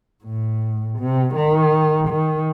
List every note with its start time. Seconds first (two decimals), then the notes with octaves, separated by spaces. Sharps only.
0.24 A2
0.99 C3
1.35 D#3
2.08 D#3